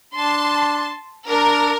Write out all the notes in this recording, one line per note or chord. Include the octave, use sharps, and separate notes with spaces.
D4 A5 C6
D4 A#4